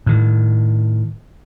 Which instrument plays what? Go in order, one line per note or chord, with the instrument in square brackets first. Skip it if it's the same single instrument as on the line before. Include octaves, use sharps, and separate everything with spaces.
[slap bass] A2 D#3